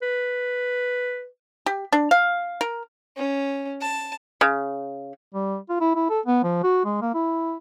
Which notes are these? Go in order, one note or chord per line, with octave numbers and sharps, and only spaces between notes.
B4
G4
D4
F5
A#4
C#4
A5
C#3
G3
F4
E4
E4
A4
B3
F3
F#4
G#3
A#3
E4